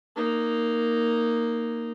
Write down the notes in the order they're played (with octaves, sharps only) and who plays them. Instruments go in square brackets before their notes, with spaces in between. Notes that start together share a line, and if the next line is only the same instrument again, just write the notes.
[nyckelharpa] A#3 D#4